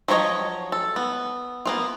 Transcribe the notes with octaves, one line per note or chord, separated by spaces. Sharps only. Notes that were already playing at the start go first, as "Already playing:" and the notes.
F3 F#3 E4 C#5 D#5
A4
B3
A#3 B3 F4